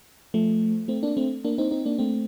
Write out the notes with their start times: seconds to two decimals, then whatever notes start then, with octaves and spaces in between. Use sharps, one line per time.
0.34 F3 A3
0.88 A3 C4
1.03 A#3 D4
1.17 A3 C4
1.44 A#3 D4
1.58 C4 D#4
1.71 C4 D#4
1.86 A#3 D4
1.98 A3 C4